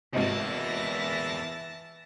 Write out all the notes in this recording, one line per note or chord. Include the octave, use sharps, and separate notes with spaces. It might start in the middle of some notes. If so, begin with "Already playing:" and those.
G#1 E2 C3 E3 A#3 D#5 A5 A#6